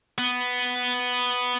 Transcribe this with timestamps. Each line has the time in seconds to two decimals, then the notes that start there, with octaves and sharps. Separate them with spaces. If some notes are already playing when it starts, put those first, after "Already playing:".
0.18 B3